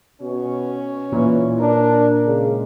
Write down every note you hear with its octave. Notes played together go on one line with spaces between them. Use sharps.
B2 C#4
A#2 E3
D4 A#4
C#3 G#3